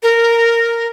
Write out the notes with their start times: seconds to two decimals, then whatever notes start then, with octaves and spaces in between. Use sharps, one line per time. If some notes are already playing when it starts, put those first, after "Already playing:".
0.03 A#4